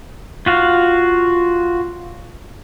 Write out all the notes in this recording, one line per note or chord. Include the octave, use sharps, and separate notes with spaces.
F4 F#4 F5